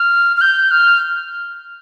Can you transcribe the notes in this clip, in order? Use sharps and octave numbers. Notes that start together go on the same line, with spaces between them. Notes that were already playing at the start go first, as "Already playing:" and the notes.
Already playing: F6
F6
G6
F6